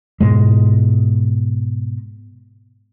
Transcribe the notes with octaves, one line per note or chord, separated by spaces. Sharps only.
G#2 B2 G#3